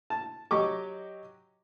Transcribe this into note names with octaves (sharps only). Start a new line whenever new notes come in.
A5
F#3 G4 D#5 C#6 D6